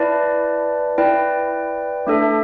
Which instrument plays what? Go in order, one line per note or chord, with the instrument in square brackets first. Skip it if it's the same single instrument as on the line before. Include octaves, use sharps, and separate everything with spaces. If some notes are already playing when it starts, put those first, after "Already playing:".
Already playing: [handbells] E4 B4 D5 A5
E4 B4 D5 G5
A3 D4 A4 E5